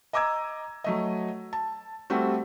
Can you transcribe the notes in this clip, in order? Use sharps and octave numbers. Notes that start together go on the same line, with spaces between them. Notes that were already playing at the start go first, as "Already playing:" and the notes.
D#5 A#5 D6 E6 G#6
F#3 A3 D#5
A5
G3 A3 C4 F#4